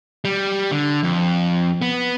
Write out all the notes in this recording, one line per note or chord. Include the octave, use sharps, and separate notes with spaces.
G3
D3
F2
B3